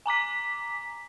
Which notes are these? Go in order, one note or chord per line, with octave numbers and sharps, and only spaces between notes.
G#5 A#5 D6 B6